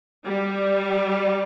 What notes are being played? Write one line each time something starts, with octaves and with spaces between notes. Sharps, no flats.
G3